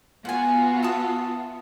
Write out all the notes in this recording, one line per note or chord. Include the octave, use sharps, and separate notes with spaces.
B3 F4 F#4 F#5 G#5
E5 A5 D#6